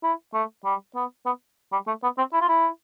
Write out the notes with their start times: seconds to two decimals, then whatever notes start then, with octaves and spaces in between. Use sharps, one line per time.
0.03 E4
0.34 A3
0.65 G3
0.95 B3
1.26 B3
1.72 G3
1.87 A3
2.03 B3
2.18 C4
2.33 E4
2.41 F4
2.49 E4